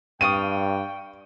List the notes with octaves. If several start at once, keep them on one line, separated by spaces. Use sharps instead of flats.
G2 D5 F5 G5 C#6 D#6 D#7